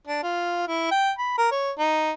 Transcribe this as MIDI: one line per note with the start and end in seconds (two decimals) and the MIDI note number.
0.07 0.22 62
0.23 0.64 65
0.67 0.88 64
0.91 1.11 79
1.19 1.35 83
1.38 1.48 70
1.51 1.71 73
1.78 2.11 63